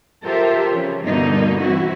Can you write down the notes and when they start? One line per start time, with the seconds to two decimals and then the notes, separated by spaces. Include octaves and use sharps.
0.23 F4 G4 A4 A#4 C5 E5
0.72 C#3 F3 C#4
1.04 G2 B2 D3 A#3 D#4
1.59 E3 C4 E4 F#4